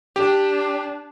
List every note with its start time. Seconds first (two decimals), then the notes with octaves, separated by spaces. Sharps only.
0.16 D4 G4